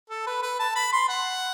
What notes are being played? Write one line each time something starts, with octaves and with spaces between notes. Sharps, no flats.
A4
B4
B4
A5
B5
C6
F#5